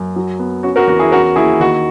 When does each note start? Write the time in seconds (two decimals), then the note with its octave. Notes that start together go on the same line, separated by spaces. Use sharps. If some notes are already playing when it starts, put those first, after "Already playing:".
Already playing: F#2
0.16 F#3
0.39 B3
0.63 C#4 F#4
0.76 F#4 A#4
0.87 E2 F#4
0.99 E4 G#4
1.12 C#4 F#4 A#4
1.36 D#2 E4 G#4
1.60 D#3 F#4